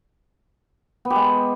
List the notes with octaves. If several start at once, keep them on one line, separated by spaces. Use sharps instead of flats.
B3
G4
G#3